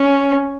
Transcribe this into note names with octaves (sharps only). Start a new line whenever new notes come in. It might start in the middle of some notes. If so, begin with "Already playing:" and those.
Already playing: C#4